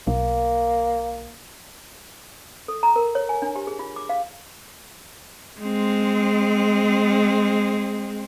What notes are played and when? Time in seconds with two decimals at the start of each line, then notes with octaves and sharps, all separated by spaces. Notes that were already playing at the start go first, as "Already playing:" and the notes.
0.07 B1 A#3
2.68 A4
2.83 A#5
2.96 A#4
3.15 C#5
3.29 G#5
3.42 D4
3.56 G4
3.67 G#4
3.79 F4
3.96 D6
4.09 F5
5.60 G#3 C4